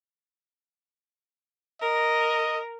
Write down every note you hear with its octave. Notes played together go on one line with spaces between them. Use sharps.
A#4 D#5